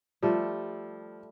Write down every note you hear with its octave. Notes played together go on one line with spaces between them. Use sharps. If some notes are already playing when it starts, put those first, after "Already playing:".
F3 G3 A3 A4